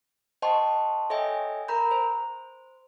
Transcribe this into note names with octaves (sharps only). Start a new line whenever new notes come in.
C5 D#5 G5 A5 C6 C#6
A4 C#5 D#5 E5 G5 G#5
A#4 A#5 B5 G6
C5